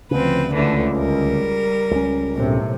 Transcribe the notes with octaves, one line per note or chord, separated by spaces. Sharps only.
D2 C#3 F3 C4 B4
C#2 D3 E3 A3
G3 A#4
C#2 C#4
B1 A2 C3